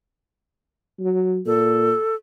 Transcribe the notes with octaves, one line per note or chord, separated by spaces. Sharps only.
F#3
A#2 A4